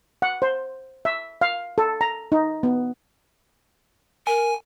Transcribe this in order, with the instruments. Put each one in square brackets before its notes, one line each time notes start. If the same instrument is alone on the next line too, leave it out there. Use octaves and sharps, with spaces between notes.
[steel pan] F#5
C5
E5
F5
A4
A#5
D#4
B3
[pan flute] A#4 [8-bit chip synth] G#5